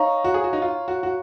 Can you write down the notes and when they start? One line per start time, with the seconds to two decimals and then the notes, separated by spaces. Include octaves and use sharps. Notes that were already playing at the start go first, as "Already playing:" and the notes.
Already playing: D#4 C#5 F5 A#5 C#6
0.24 F#4
0.34 G#4
0.44 F#4
0.53 D#4
0.62 F4
0.88 F#4
1.03 F#4